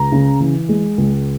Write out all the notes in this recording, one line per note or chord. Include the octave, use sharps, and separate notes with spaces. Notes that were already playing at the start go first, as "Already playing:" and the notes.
Already playing: C#2 A#5
C#3
E3
G#3
C#2